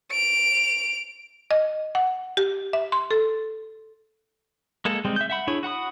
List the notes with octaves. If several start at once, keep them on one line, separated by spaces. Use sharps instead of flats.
D7 F7
D#5
F#5
G4
E5
C6
A4
G#3 A#3 A4
G3 G#3 C4
E5 G6
E5 F#5 B5
D4 E4 G#4 C#5 B5
F#4 F#5 B5 D#6